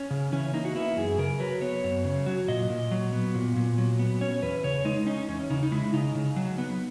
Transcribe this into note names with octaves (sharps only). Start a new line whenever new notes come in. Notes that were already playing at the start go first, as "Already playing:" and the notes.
Already playing: C#4
C#3
E3 C#4
A#3 D#4
F#4
B3 E4
F#2 G#4
C#3 A#4
F#3 B4
B3 C#5
F#2
C#3
F#3
A#2 D#5
A#2
F#3
B3
A#2
A#2
F#3
B3
C#4 C#5
E2 B4
C#3 C#5
G#3 D#4
C#4 D#4
E2 C#4
C#3 D#4
D#4
G#3 E4
C#3 D#4
C#3
F#3
B3